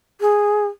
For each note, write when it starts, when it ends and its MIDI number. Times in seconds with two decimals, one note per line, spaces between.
0.21 0.66 68